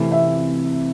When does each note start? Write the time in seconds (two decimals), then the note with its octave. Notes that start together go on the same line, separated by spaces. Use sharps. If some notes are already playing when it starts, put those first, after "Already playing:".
Already playing: C3 E3 A3
0.12 E5